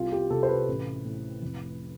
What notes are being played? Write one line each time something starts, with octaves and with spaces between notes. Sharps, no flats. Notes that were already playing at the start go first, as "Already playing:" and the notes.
Already playing: C2 F4
G4
C3 A4
C5
B4
A1
A2
F1